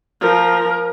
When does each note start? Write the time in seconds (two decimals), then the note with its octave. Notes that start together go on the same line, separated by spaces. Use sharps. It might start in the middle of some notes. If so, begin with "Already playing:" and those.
0.21 F3 A#4